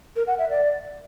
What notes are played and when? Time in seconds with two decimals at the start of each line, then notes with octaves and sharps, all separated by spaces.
0.16 A#4
0.27 F#5
0.38 E5
0.50 D5